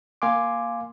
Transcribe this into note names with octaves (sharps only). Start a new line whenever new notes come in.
A#3 F5 G#5 C6 D6